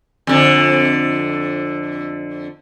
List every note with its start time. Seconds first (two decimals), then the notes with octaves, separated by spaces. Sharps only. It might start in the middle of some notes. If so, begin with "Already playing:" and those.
0.27 F2 D3